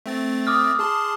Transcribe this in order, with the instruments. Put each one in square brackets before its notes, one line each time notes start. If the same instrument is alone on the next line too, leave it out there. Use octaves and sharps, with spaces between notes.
[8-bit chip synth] A3 C4 A6
[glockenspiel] D6 D#6 F6
[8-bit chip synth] G#4 A5 C6